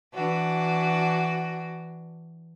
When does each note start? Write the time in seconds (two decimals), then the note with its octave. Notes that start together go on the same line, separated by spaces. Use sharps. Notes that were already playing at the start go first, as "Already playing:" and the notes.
0.14 E3 D4 F#4